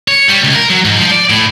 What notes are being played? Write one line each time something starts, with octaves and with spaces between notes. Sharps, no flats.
C#5
G3
C#2
A#4
F#3
G#2
F3
D5
A2